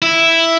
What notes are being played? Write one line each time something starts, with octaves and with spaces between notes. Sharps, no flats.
E4